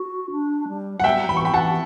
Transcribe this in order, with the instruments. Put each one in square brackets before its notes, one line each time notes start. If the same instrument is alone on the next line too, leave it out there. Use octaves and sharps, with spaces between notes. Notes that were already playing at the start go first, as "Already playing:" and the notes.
Already playing: [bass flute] F#4
D4
G3
[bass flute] F#3 [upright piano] F#5
[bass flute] G3 [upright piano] E5 G5
[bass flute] E3 [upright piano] B5
[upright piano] C#6
G5 B5
[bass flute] E3 [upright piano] F#5 A5